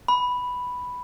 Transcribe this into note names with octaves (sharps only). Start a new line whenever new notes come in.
B5